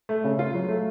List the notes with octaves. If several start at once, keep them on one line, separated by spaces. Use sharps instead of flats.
A3
C#3
F4
F#3
A3